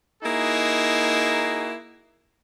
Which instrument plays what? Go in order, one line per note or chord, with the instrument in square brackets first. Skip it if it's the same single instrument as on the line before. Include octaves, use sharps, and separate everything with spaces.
[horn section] A#3 D#4 E4 F#4 G#4